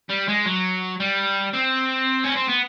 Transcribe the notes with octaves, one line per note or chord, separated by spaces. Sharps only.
G3
G#3
F#3
G3
C4
C#4
C4
B3